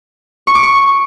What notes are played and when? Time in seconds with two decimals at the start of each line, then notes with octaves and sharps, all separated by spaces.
0.47 C#6
0.55 D6
0.63 C#6